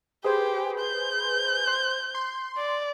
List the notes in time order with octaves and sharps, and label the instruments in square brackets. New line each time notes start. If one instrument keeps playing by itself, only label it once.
[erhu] G4 [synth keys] G#4 B4 C5
[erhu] G6
[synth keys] C5
C6
[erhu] D5